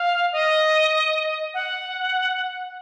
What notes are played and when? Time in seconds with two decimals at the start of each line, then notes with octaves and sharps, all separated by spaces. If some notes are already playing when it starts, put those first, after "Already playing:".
Already playing: F5
0.32 D#5
1.54 F#5